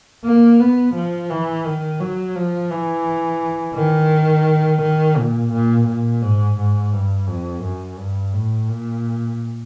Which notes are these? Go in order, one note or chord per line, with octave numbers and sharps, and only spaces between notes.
A#3
B3
F3
E3
D#3
F#3
F3
E3
D#3
D#3
A#2
A#2
A#2
G#2
G#2
G2
F2
F#2
G2
A2
A#2